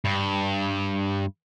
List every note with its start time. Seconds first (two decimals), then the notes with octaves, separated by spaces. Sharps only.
0.05 G2